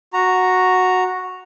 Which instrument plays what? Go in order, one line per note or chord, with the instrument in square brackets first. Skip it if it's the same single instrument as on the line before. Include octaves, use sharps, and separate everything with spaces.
[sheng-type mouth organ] F#4 A#5